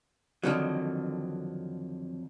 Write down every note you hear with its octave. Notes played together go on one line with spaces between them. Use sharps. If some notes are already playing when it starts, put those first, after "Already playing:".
F2 A2 D3 D#3 F#3